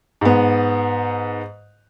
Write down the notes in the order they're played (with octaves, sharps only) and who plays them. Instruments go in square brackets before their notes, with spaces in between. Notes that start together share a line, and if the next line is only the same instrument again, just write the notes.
[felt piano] G#2 B3